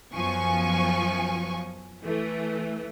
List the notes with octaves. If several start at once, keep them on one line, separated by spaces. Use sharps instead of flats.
F#2 F3 B3 G#5 C#6
E3 A3